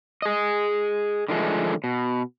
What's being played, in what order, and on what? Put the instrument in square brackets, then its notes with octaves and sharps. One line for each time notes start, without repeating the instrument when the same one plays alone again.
[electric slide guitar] G#4 D#5
D3 D#3 F3 G#3 A3
B2